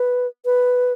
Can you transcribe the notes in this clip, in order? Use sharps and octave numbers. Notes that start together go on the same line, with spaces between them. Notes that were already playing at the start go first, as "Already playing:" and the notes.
Already playing: B4
B4